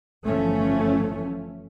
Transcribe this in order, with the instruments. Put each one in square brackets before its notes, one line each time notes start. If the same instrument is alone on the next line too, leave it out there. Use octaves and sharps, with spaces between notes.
[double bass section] G1 E3 F3 A3 C#4